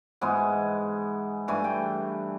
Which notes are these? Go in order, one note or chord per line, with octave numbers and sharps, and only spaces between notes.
G#2 E3 G#3 B3 G#5
G2 E3 A3 G#5
G5